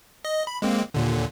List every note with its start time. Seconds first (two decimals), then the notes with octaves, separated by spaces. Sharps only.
0.25 D#5
0.47 B5
0.62 G#3 A#3 C4
0.94 D#2 A#2 D3